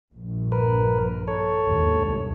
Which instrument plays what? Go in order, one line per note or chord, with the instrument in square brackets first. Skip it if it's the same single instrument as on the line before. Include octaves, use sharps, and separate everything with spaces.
[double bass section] A#1 G2
[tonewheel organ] A#4 B4
A4 C#5
[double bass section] G1 D#2 G#2
C2